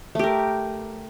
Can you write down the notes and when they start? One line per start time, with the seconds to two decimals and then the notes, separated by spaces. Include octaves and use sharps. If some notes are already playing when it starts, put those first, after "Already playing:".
0.15 A3
0.19 G4
0.24 A#4